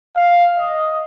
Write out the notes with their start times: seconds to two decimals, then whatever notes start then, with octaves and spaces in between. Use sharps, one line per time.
0.15 F5
0.58 D#5